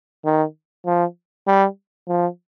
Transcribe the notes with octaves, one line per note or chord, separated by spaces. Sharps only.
D#3
F3
G3
F3